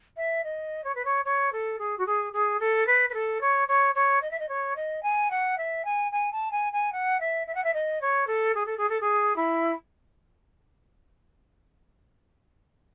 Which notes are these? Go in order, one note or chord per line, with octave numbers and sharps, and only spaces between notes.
E5
D#5
C#5
B4
C#5
C#5
A4
G#4
F#4
G#4
G#4
A4
B4
B4
A4
C#5
C#5
C#5
D#5
E5
D#5
C#5
D#5
G#5
F#5
E5
G#5
G#5
A5
G#5
G#5
F#5
E5
E5
F#5
E5
D#5
C#5
A4
G#4
A4
G#4
A4
G#4
E4